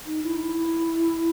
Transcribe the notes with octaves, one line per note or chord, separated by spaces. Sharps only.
D#4
E4
D#4
E4